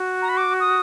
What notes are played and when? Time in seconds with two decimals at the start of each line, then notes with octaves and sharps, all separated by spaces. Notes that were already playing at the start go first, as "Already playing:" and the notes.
Already playing: F#4
0.22 A#5
0.29 B5
0.37 D6
0.60 D#6